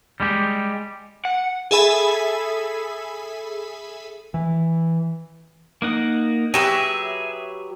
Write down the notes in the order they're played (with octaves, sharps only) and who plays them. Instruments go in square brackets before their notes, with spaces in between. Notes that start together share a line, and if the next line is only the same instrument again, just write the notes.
[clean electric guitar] G3 G#3 G4
[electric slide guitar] F#5
[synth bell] G#4 A4 E5 G#5 B5
[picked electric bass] E3
[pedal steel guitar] A#3 D#4 F#5
[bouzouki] F#3 G4 B4 [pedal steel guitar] G#4 E5